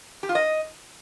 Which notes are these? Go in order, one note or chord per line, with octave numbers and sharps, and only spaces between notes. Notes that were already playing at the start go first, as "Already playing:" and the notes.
G4
F4
D#5